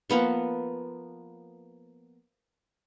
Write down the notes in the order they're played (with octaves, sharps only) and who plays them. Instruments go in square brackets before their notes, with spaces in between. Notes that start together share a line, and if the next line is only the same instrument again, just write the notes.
[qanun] F3 A#3 B3 C#6